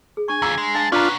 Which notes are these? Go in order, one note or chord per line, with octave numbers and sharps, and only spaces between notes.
G#4
D4 G#5 C#6
E2 F4 F5 A#5 E6
G#3
D4 F5 A5 D6
B3 C#4 D4 F4 B4 D5 A#5